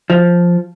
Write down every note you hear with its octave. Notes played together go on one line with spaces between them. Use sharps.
F3